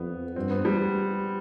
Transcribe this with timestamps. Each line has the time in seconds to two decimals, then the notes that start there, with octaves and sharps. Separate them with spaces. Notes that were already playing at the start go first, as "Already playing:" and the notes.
Already playing: F2 B3
0.36 G2 C4
0.50 B3
0.65 G3